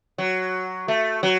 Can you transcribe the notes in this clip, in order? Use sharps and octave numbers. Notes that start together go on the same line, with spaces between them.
F#3
A3
F#3